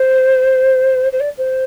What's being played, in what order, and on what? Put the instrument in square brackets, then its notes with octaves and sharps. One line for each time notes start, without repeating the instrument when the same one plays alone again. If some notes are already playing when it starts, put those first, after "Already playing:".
Already playing: [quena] C5
C5
D5
C5